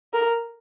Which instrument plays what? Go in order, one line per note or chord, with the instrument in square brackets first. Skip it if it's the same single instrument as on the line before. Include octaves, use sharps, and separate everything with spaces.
[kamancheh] A#4